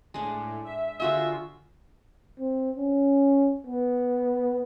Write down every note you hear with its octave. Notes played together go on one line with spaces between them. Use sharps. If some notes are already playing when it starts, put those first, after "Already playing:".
A2 G#3 D4
E5
D3 F4 F#4 G#4 E5
C4
C#4
B3